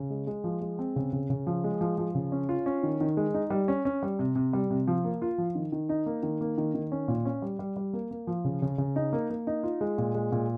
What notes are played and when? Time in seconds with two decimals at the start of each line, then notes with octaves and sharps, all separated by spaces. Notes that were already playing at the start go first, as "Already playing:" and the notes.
Already playing: C#3
0.10 G#3
0.27 G#3
0.44 F3
0.62 G#3
0.79 C4
0.96 C#3
1.13 C#3
1.30 C#3
1.47 F3
1.64 G#3
1.81 F3
1.98 F3
2.15 C#3
2.32 C#4
2.49 F4
2.66 C#4
2.83 D#3
3.00 D#3
3.17 G#3
3.34 D#4
3.50 G3
3.68 C#4
3.85 C#4
4.03 G3
4.19 C3
4.36 C3
4.53 G3
4.71 C3
4.87 F3
5.04 A#3
5.22 F4
5.38 F3
5.55 D#3
5.72 D#3
5.89 D#4
6.06 A#3
6.23 D#3
6.41 A#3
6.58 D#3
6.74 D#3
6.92 C#4
7.08 A#2
7.25 C#4
7.42 G3
7.59 G3
7.76 G3
7.93 A#3
8.11 A#3
8.27 F3
8.45 C#3
8.62 C#3
8.78 C#3
8.96 D#4
9.13 A#3
9.30 A#3
9.47 D#4
9.63 F4
9.81 G#3
9.98 A#2
10.15 G#3
10.32 A#2